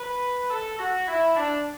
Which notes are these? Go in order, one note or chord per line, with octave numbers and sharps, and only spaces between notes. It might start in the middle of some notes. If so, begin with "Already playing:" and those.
Already playing: B4
A4
F#4
E4
D4